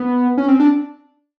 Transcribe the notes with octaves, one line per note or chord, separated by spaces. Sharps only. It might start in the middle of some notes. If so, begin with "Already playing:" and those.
Already playing: B3
C#4
C4
D4